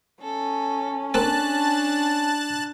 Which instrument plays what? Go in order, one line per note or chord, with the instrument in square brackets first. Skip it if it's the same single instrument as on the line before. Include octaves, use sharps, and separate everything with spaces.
[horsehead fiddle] C#4 [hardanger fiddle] A4
[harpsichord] A#3 C4 A4 [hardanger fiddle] D4 [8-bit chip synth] A5 F#6 A6